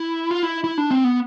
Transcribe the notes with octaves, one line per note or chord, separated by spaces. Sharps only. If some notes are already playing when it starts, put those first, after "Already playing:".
Already playing: E4
F4
E4
E4
D4
C4
B3